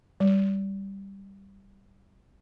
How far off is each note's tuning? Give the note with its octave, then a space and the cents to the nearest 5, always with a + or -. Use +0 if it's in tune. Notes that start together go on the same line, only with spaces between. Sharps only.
G3 +0